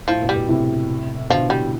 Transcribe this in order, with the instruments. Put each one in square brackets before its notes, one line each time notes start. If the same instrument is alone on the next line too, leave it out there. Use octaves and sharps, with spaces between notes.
[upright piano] A2 [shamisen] F3
[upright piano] B2
[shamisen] G3
[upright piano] B2
A2 C3
[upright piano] B2 D3 [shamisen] F3
[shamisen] G3